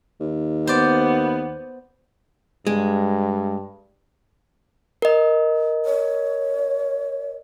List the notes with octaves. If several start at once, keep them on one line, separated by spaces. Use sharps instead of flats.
D#2
B3 C5 D5
G2 G#3
A#4 D#5
C#5